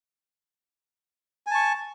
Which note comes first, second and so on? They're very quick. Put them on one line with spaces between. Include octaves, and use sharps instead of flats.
G#5 A5 C#6